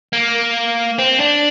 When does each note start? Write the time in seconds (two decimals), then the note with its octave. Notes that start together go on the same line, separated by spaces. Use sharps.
0.13 A#3
0.99 C4
1.20 D4